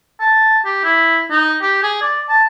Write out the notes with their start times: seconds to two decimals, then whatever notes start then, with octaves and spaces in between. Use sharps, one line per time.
0.21 A5
0.65 G4
0.85 E4
1.31 D#4
1.62 G4
1.83 G#4
2.02 D5
2.29 A5